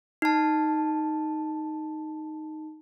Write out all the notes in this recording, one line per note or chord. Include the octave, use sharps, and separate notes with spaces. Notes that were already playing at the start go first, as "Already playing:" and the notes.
D#4 A5